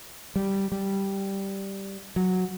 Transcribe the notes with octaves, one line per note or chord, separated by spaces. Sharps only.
G3
G3
F#3